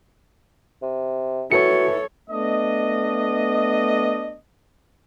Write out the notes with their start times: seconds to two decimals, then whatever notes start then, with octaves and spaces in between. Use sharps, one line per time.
0.82 C3
1.52 E3 F#4 A4 C#5 C#7
2.30 A3 B3 D4 D#5